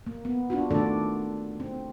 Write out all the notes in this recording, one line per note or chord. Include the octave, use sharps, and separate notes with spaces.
A#3
B3
D4 F4 F#4
D#3 A3 D4 A4 D5
C4